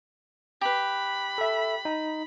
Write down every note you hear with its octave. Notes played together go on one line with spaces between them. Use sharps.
G4 B4 B5
A4 E5
D#4